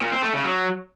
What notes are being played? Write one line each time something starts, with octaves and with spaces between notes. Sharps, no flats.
A#2
C4
A3
C#3
F#3